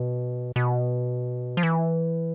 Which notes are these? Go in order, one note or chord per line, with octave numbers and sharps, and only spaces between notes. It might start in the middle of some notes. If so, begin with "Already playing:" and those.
Already playing: B2
B2
F3
E3